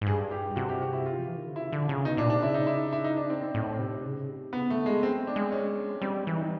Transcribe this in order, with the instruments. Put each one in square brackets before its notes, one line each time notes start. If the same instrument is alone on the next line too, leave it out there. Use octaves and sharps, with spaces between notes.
[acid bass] G#2
[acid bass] G2 [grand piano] G#4
[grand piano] G4
[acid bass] C3 [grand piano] F#4
[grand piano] G4
F#4
E4
F4
[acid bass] F3
E3
D#3
D3
[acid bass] C#3 [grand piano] E4
[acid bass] D3
C#3
[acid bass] B2 [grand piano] D#4
[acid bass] A#2 [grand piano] D4
[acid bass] C3 [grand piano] D4
[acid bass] C#3 [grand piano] E4
[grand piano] D#4
E4
E4
D#4
D4
C4
C4
[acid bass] A2
C3
C#3
C3
[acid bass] C#3 [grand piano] B3
[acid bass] D3 [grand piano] A3
[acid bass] C#3 [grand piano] G#3
[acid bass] F#3 [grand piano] C4
[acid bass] G3
[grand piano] D4
[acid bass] G#3
[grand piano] C#4
[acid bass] G3 [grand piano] C4
[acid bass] E3
[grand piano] D#4